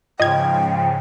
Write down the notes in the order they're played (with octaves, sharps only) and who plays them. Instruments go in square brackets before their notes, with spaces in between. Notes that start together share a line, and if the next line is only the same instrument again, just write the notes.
[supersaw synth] G#2 C#3 [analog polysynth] F3 [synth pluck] D#5 G#6 [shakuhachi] G5